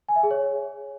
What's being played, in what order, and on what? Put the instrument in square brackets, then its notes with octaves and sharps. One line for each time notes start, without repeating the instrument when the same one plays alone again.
[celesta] G#5
E5
G#4
C#5